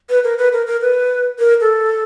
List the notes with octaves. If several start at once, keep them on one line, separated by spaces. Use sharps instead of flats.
B4
A#4
B4
A#4
A#4
B4
A#4
A4